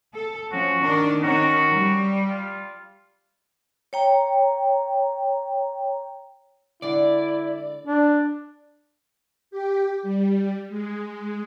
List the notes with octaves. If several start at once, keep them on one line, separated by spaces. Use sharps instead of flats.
A4
F3 C#4 F#4
D#3 D4 A#4
D#3 C#4 F#4 A#4
G3
F4
C#5 G5 A#5
D3 G#3 E4 D5
D4
G4
G3
G#3